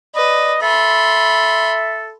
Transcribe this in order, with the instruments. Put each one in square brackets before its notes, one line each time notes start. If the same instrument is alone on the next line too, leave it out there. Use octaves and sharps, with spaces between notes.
[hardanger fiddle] B4 [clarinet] D5 [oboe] D#5
[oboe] A4 [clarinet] E5 [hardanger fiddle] B5 C6